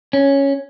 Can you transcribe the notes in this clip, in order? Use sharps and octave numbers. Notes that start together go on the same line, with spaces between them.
C#4